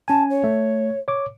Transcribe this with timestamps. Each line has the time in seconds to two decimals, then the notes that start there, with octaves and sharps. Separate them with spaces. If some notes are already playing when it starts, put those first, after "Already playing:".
0.08 C#4 G#5 A5
0.30 C#5
0.44 A3
1.08 C#5 D6